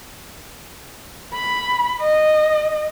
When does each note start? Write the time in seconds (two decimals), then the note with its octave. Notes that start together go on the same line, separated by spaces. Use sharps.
1.34 B5
2.01 D#5